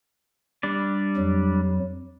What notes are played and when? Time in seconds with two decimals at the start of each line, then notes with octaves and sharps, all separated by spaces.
0.63 G3 D4 D5
1.17 F2 F#3